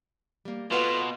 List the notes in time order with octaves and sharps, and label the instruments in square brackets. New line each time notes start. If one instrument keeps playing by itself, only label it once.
[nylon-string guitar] G3 A#3
[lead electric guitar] B2 [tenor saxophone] F4 [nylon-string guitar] A4 B4 F#5